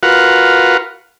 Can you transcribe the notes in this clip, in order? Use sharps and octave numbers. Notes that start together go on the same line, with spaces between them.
F4 F#4 A#4 B4 F5 F#5